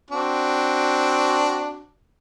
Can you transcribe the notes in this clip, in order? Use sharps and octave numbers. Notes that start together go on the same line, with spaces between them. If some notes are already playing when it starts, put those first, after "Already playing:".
C4 D4 F#4